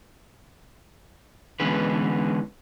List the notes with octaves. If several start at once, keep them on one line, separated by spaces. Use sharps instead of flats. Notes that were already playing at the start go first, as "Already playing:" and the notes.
D3 E3 G#3 B3 C#4 B4